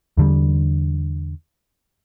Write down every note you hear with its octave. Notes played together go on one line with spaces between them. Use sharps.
E2 D3 G3